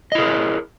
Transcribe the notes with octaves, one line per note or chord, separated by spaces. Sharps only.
E4 G#4 A#4 D#5